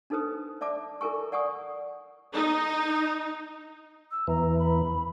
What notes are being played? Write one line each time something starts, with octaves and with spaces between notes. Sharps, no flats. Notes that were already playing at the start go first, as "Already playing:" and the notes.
D4 D#4 A4 B4 C5 D#6
D5 E5 A5 D6
E4 A4 A#4 G#5 C#6
D5 F#5 G#5 C#6 D#6
D#4
E6
E2 E3 A#5
B5